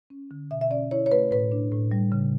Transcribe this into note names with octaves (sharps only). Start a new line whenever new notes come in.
C#4
D3
B2 E5
E5
C#4 D5
E4 C#5
C#5
A3 B4
A2 B4
D4
A2
G3
C#3